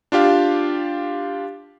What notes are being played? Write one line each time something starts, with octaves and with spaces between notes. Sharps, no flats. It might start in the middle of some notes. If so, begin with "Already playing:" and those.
D4 F4 G4 F5